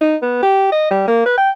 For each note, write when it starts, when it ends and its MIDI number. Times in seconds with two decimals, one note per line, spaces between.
0.01 0.16 63
0.22 0.38 59
0.43 0.71 67
0.72 0.89 75
0.91 1.07 55
1.07 1.23 58
1.26 1.34 71
1.38 1.50 79